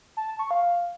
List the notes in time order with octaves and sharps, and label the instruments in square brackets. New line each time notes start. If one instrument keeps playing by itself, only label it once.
[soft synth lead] A5
A5
C#6
F5